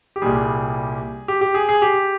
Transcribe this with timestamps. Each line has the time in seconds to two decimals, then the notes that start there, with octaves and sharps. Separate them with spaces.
0.16 G4
0.22 C2 A#2 G3 G#4
1.28 G4
1.41 G4
1.54 G#4
1.69 G#4
1.82 G4